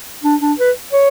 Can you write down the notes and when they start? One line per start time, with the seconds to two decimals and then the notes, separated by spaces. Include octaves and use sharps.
0.24 D4
0.41 D4
0.59 B4
0.93 C#5